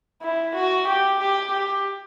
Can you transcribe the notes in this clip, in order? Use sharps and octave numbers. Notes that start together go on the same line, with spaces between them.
E4
F#4
G4
G4
G4